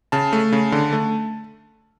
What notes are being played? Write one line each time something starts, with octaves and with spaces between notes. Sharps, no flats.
C#3 A5
A3
C#3
D3
A3